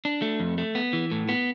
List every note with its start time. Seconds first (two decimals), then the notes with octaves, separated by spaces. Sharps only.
0.05 D4
0.22 A3
0.40 F2
0.58 A3
0.75 B3
0.93 E3
1.12 A2
1.29 B3